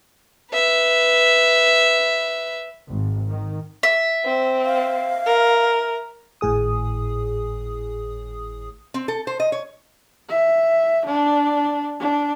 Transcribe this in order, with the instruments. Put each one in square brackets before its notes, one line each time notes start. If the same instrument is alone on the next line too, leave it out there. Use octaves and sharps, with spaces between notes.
[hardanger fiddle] B4 E5
[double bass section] G#1
D#3
[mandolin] E5
[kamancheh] C4
[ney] F5
[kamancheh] A#4
[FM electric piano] G#1 A2 G#4 D#6
[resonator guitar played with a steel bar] C4
A4
C5
D#5
C#5
[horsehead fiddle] E5
D4
D4